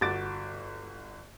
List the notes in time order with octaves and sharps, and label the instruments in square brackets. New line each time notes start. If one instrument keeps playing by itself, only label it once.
[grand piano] G1 F#4 D6 A6 D7